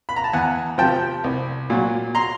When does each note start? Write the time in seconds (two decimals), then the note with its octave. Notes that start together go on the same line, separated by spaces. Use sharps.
0.09 B5
0.16 A#5
0.24 A5
0.33 E2 F#5 G#5
0.78 C3 F3 G5 A5
1.24 C2
1.70 A#2 F#3
2.15 A#5 C6